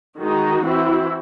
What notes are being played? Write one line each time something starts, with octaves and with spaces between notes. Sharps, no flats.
D#3 G#3 D#4 F#4
E3 C4 E4